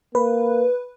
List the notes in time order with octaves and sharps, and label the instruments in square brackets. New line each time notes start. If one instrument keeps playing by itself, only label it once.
[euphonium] A#3 [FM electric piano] B4